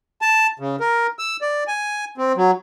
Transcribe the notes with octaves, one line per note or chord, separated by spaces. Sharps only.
A5
C#3
A#4
E6
D5
G#5
C4
F#3